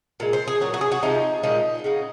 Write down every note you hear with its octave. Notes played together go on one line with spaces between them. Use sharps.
A#2 G#3
C5
G#4
A#2 F#3 F#4
F#4
G#4
F#4
C3 F3 G#3 D#4
A#2 F3 G#3 D#4
C#3 F#3